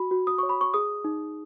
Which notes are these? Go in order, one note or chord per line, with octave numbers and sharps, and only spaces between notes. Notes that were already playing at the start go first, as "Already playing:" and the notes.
Already playing: F#4 B5
F#4
D#6
C#5 C#6
B5
C#6
G#4 D#6
D#4